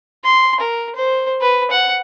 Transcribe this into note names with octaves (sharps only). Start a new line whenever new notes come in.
C6
A#4
C5
B4
F#5